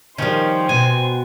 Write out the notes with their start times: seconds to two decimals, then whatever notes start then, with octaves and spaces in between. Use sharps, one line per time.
0.18 D#3 F3 G3 C#4 C5 G5
0.69 B2 G#5